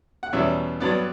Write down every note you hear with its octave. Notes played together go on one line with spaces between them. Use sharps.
F#5
E2 B2 G3 C#4 E5
G2 F#3 B3 D5